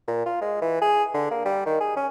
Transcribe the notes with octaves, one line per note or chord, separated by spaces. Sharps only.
A#2
F4
G#3
E3
G#4
D3
A#3
G3
D#3
G#4
C#4